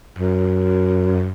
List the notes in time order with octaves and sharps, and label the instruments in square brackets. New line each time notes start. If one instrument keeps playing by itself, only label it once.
[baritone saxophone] F#2